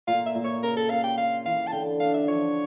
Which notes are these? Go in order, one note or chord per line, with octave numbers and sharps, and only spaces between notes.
A#2 F5
E5
A#2
C#5
C#3 A#4
A4
C#3 F5
G5
F4 F5
E3 F5
A5
D3 G5
D4 F5
E5
F3 C#5